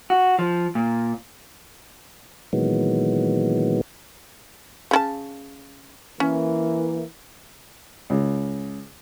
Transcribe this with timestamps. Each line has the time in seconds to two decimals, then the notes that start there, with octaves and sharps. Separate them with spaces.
0.10 F#4
0.39 F3
0.75 A#2
2.53 A#2 D#3 E3 F#3 G#3 B3
4.91 C#3 E4 A5
6.20 E3 A#3 C#4
8.10 C#2